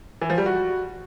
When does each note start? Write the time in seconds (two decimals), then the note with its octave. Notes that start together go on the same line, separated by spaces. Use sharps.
0.22 E3
0.30 F3
0.38 G3
0.46 F#4